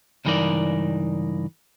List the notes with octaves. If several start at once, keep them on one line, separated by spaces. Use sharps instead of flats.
C#2 G2 E3 D#4 A#4 D5